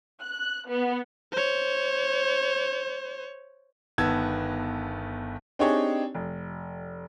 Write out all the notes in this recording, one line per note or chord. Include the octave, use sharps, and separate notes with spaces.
F#6
B3
C5 C#5
G1 D#3 B3 A5 E6 G#6
C4 D4 D#4 G4 G#4 C#5
F1